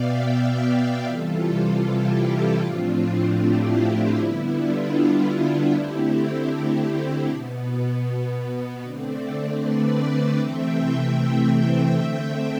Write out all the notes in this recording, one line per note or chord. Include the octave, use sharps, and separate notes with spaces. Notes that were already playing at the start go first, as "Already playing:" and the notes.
Already playing: B2 B3 D5 E5 F5 G5
D5 F5
C3 E3 G3 F4 A4
E4 G4
E4
A2 F3 A3 C4 D4 F4
E4 G4
D3 G3 B3 E4
D4 F4
D3 A3 C4 E4 G4
E4 G4
E4
B2 B3
D3 A3 C4 D4
B4 D5
C3 E3 A3 C4 E5 G5
C5 E5
D3 A3 C4 E5 G5